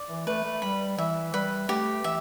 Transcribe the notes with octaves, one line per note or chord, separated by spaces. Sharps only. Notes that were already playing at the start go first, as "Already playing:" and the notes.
Already playing: D5
E3
A3 B4
A3
G3 B5
E3 E5
G3 B4
A3 G4
E3 E5